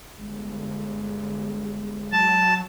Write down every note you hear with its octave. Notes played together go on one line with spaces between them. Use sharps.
G1 G#3
F#3 A5